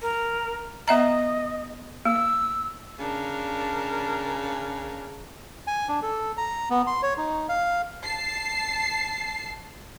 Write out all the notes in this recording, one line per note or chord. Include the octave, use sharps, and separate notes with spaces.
A#4
B3 D#5 E5 A#5
A#3 E6
C#3 D4 A#4
G#5
D4
A4
A#5
B3
C6
C#5
D#4
F5
A5 C7